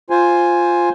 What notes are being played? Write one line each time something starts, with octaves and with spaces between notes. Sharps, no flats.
F4 C5 G#5